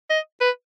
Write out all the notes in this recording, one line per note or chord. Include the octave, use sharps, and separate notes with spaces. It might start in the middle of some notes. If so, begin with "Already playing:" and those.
D#5
B4